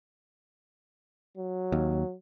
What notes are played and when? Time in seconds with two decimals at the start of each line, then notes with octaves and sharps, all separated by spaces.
1.37 F#3
1.72 D#2